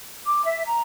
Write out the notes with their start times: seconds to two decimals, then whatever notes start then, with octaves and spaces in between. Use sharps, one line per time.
0.24 D6
0.44 E5
0.65 A#5